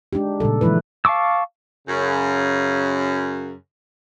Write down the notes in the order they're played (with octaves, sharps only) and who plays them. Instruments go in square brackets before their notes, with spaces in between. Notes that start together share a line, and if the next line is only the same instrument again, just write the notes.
[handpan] G#3 D4 D#4 G4
A#2 C#3 G3 A4
E3 F3 G#3 E4 B4
[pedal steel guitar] F5 A5 C#6 D6 E6
[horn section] F#2 C#3